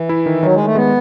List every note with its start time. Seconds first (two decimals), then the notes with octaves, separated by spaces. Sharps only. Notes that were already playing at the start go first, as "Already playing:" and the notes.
Already playing: E3
0.09 E4
0.26 D#3
0.43 D#3 F#3
0.54 D#3 G#3
0.65 A3
0.75 G#3 B3